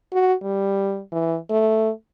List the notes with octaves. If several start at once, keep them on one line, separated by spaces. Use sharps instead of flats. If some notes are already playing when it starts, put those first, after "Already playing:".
F#4
G3
E3
A3